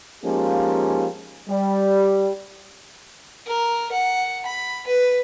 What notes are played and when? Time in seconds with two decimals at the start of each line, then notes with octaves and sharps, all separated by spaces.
0.24 F3 G#3 A#3 C#4 D#4 G4
1.49 G3
3.47 A#4
3.92 F#5
4.46 B5
4.87 B4